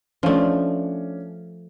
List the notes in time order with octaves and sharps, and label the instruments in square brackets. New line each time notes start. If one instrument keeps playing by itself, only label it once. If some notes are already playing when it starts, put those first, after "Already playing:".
[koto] F3 A3 [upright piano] C#4 D4